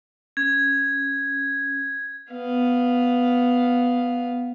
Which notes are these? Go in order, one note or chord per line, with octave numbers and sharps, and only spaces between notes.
C#4 G#6
B3 F5